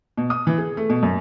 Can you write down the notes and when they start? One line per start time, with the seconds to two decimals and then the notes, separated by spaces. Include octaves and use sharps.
0.17 B2
0.30 D#6
0.47 E3
0.58 G#4
0.77 A3
0.90 B2
1.03 F#2